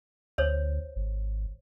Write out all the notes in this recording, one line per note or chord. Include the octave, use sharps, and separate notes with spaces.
D2 C5 C#5
G#1